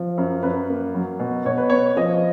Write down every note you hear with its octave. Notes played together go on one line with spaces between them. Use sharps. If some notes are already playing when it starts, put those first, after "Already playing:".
Already playing: F3
F#2
F#2 B4
A#3
F#3
B2
B2 C#5
B4
B3 C#5
F3 D#5